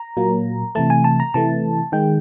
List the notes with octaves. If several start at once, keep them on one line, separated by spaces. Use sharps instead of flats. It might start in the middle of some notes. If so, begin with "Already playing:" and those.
Already playing: A#5
A#2 F#3 A#3
C3 E3 A3 A5
G#5
A5
A#5
C3 E3 A3 A5
D#3 G#3 G5